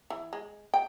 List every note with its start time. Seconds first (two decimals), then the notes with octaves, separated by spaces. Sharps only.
0.10 E3
0.33 G#3
0.74 G5